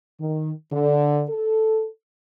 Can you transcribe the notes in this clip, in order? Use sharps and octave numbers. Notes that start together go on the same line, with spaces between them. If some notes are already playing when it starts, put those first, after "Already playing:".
D#3
D3
A4